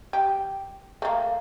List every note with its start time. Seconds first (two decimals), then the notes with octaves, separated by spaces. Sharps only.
0.13 G4
1.02 A3 A#3